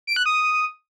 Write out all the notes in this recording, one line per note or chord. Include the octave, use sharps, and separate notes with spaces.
D7
F#6
D#6